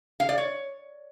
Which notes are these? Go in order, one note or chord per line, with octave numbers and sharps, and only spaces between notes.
F5
D5
C#5